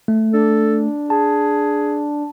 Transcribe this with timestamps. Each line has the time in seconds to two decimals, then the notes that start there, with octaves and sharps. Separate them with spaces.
0.08 A3
0.33 D4 A4
1.10 G#4 A5